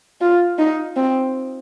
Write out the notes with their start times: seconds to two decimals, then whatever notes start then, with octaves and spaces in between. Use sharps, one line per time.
0.21 F4
0.58 D#4
0.96 C4